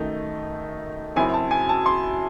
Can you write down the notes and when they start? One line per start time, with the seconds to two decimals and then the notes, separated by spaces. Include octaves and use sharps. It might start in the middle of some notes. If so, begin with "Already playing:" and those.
Already playing: F#2 D#3 A3 D#4
1.16 F#2 C#3 F#3 C4 E4 G#5
1.34 A5
1.51 G#5
1.69 A5
1.86 C6